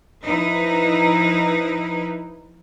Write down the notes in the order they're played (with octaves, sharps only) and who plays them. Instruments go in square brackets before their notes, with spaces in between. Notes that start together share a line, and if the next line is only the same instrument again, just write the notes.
[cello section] F3 D#4 E4 B4